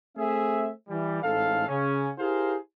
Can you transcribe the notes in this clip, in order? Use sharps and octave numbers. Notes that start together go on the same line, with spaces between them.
A3 C4 G#4 E5
E3 G3
A1 G#2 A4 F5
C#3 C#4
E4 G4 G#4 A#4 C5 F5